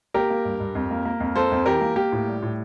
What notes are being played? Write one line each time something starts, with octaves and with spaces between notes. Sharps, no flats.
A#3 G4 A#4
A#3
G2
G2
F2
A#3
A#3
F2
A#3 A4 C5
F2
E3 G4 A#4
A#3
A#3 G4
A2
G3
A2